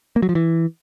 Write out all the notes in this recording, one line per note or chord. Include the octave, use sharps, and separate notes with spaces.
A#3
F#3
F3
E3